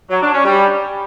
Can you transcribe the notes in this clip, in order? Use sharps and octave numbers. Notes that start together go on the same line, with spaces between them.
F#3
D4
C#4
G3